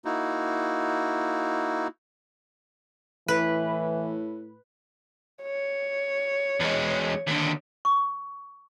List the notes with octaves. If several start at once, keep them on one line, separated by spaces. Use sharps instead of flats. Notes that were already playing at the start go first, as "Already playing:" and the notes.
A#3 D#4 E4 F#4
A2 E3 B4
C#5
E2 G#3
D#2 D3
C#6